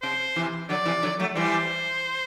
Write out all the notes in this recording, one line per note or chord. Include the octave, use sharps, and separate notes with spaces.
C3 C5
C3 E3
D3 F#3 D5
C3 E3
D3 F#3
F#3 A3
E3 G3 C5